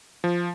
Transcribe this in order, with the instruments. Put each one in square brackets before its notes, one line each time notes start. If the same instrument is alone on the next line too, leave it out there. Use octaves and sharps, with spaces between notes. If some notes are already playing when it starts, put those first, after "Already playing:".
[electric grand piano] F3